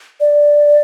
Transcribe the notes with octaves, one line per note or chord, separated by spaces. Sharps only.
D5